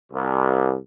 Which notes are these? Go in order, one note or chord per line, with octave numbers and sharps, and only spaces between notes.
C2